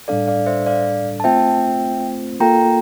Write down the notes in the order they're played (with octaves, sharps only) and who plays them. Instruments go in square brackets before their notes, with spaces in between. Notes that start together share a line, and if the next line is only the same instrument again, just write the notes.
[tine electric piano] A2 G3 D4 A4 [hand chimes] D5 F5
[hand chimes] D5 F5
C5 E5
D5 F5
A5
[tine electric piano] A3 C4 F4 C5 [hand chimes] E5 G5
[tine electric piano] A#3 F4 A4 [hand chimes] G5 A#5